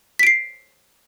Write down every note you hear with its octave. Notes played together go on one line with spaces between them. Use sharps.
B6 C7 D7